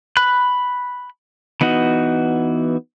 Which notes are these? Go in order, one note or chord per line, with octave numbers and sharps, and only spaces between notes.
B5 F#6
E3 B3 D#4 F#4